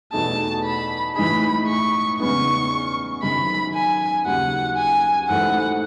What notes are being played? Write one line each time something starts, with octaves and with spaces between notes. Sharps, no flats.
E2 B2 A3 D#4 G#4 A5
B5
A2 E3 G#3 D#4 G#4 B5
C#6
E2 C#3 G#3 B3 D#4 C#6
G#1 F#2 D#3 G#3 B5
G#5
D#2 C#3 F#3 F#5
G#5
G#1 G#2 E3 A3 F#5